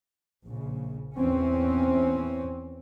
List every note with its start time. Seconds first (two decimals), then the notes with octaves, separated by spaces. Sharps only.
0.44 A#1 C#3
1.16 E2 E3 C4 C#4